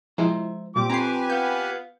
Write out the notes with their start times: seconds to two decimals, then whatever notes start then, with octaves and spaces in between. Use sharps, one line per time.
0.18 F3 G#3 E4 C5 E5 A#5
0.76 A#2 G3 C4 G4 D6
0.90 C4 F4 G4 B4 C5 G#5 A#5 C7
1.30 B3 F5 G6